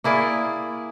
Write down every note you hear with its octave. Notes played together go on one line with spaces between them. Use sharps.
A#3 E4 G#4 D5